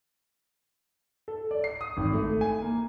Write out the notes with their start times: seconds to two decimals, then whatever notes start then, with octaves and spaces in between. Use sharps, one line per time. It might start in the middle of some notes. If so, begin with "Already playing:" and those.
1.28 A4
1.51 D5
1.64 C7
1.81 D#6
1.97 G#1
2.13 A3
2.41 G#5
2.62 A#3